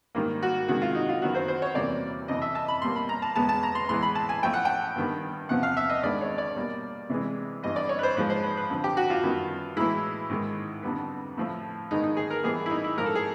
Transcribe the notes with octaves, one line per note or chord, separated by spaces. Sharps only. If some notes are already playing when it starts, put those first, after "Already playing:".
G#2 D#3 G3 A#3
F#4
C3 D#3 G#3 F#4
F4
D#4
F4
F#2 D#3 F#3 B3 F#4
C5
C5
C#5
E2 C3 E3 G3 A#3 D5
F2 C3 E3 D#5
E5
A5
B5
B2 G3 A#3 C6
B5
A#5
A5
E2 B2 G#3 B3 A5
A5
A#5
C6
A2 E3 G#3 B3 C6
B5
A5
G#5
A2 F3 A3 G5
F#5
G5
G2 D#3 G3 B3
E2 C3 F3 F#5
F5
E5
D#5
G2 D#3 G#3 B3 D5
C#5
D5
B2 G3 A#3
C3 E3 G#3
G2 E3 G3 B3 D#5
D5
C#5
B4
C5
G#2 F3 G#3 B4
C5
B4
B4
F2 D3 F3
G4
F#4
F4
F#2 D#3 G3 B3
A2 E3 G#3 E4
G#2 D#3 G#3
F2 D3 G3 B3
A2 F3 A3
G#2 D#3 G#3 B3 D#4
D#4
G#4
A#4
A2 E3 G3 B3 G#4
E4
D#4
E4
G#2 F3 A3 A#4
A4
G#4